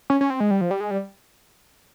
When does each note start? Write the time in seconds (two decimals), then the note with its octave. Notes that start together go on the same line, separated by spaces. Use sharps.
0.10 C#4
0.21 C#4
0.30 C4
0.40 G#3
0.51 G3
0.61 F3
0.71 G3
0.80 G#3
0.91 G3